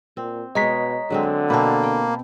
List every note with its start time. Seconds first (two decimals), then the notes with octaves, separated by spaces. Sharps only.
0.17 A#2 C4
0.55 B2 G#3 C#5 D#5 A#5 B6
1.10 D3 F#3 G#3 C4
1.50 B2 A#3 C4 A5 B5
1.83 G5